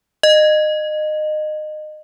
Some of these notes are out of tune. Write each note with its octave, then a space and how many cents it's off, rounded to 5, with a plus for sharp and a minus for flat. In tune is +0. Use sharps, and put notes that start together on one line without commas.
D#5 -25